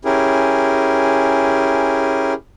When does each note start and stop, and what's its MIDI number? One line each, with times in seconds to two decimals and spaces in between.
0.05 2.34 61
0.05 2.34 64
0.05 2.34 67
0.05 2.34 68
0.05 2.34 70